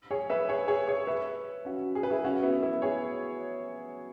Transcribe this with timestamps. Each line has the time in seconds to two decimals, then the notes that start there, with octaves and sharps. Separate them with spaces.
0.11 G#4 C#5
0.30 B4 E5
0.49 G#4 C#5
0.68 G#4 C#5
0.88 G#4 C#5
1.07 B4 E5
1.65 C#4 F#4
1.95 G#4
2.03 B4
2.10 E4 G#4
2.25 C#4 F#4
2.43 B3 E4
2.62 B3 E4
2.82 G#4 C#5